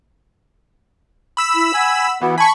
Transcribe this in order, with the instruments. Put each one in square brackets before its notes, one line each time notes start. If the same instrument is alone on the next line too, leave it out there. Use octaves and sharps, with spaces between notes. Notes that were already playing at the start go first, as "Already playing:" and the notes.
[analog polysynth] B5 E6 B6
[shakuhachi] E4
[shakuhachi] F#5 [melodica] G#5
[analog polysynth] E3 [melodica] B3 [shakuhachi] F#4
[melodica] G#5 [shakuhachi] A5 [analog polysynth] B5 C#6